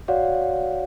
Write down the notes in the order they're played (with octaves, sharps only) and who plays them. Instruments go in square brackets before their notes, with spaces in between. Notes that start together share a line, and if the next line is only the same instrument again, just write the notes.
[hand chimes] F#4 C#5 D5 F5 F#5